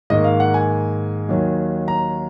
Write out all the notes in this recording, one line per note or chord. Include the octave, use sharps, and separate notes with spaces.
G#2 D#3 A#3 D#5
F5
F#5
G#5
D#2 D#3 F#3
A#5